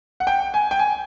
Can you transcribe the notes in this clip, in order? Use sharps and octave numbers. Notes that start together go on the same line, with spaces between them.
F#5
G5
G#5
G5
G#5